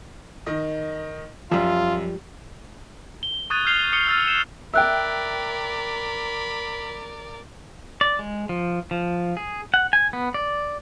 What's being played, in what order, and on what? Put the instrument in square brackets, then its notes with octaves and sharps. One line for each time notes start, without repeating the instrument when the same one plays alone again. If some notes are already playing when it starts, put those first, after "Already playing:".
[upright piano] D#3 D#5
[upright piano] F#2 [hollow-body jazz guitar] F3 G3 [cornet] F4
[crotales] G7
C#6 D#6 F#6 G#6 A6 D#7
D#6 F6 G6 C7 F7 G7
D#6 C#7 G7
E6 F6 A6
E7
[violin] A#4 D5 [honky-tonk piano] E5 G5 [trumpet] B5 [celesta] E6 F#6
[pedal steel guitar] D5
G#3
F3
F3
G#4
F#5
G#5
B3
D5